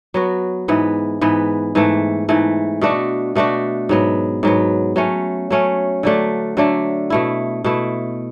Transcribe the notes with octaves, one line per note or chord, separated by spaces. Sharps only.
F#3 B3 F#4
G#2 E3 B3
G#2 E3 B3
G#2 E3 A3
G#2 E3 A3
B2 A3 D4 F#4
B2 A3 D4 F#4
G#2 F#3 B3
G#2 F#3 B3
F#3 A3 C#4
F#3 A3 C#4
D3 F#3 A3 D4
D3 F#3 A3 D4
B2 A3 E4
B2 A3 E4